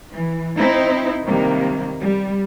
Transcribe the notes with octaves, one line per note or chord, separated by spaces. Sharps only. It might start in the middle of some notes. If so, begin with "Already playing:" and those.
E3
C4 D#4 E4
C3 D#3 G3 A#3
G3